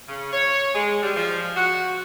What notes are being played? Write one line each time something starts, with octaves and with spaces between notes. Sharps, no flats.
C#3
C#5
G#3
G3
F3
F#4